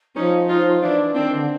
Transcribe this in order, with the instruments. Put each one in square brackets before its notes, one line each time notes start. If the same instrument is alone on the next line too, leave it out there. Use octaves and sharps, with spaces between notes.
[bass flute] F3 [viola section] C#4 D#4
[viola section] D#4 F4
[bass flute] E3 [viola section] D4 E4
[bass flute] D#3 [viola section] C4 D4
[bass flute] D3